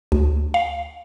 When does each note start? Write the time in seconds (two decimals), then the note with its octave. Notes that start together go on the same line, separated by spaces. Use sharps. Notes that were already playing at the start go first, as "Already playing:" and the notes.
0.12 D2
0.54 F5